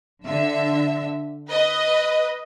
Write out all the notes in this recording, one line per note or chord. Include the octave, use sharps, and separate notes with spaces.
D3 E5
B4 D#5